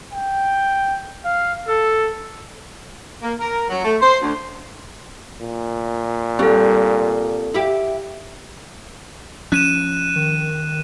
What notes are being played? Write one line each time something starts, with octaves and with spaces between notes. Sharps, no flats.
G5
F5
A4
A#3
A#4
F#3
A3
C5
D2
A#2
G3 C4 A4
E4 G4
F3 C#4 F#6 D#7 E7
D#3